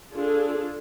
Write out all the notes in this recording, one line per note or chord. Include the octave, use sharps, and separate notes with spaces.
D4 F4 G#4 A4